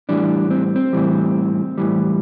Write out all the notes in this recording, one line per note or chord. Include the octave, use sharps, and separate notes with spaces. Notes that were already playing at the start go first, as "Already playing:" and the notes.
A2 E3 G3 D4
C4
C4
A2 E3 G3
A2 E3 G3